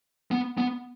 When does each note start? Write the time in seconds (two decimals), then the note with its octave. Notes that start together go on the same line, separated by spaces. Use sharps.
0.31 B3
0.58 B3